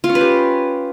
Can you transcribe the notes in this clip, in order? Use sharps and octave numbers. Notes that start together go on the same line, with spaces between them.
F4
C#4
B4
G4